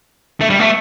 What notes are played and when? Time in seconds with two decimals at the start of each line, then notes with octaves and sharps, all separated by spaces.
0.41 A3
0.50 G3
0.59 A3